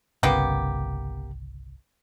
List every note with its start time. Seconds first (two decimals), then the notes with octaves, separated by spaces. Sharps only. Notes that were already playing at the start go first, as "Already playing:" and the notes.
0.23 G1 C2 C#3 A#3 B3 G4